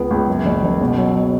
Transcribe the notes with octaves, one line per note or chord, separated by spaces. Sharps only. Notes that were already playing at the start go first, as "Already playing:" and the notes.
Already playing: C#2 B3
C#2
F#2
F#1
F#1
B2
F#3